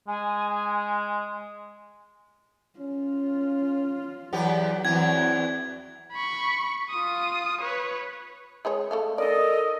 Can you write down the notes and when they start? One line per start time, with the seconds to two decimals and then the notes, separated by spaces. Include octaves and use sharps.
0.08 G#3 G#5
2.79 C#4 F4
4.33 E2 F#3 B3 G4
4.85 E2 E3 C4 F#4 G#6
6.12 B5 C#6
6.90 F4 D#6
7.61 B4 C#5
8.65 G#3 G#4 C#5
8.91 A3 A4 F5
9.18 D#4 A4 A#4 D5 D#5